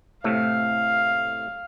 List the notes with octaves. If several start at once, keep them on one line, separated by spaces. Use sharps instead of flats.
A2 C3 A3 F5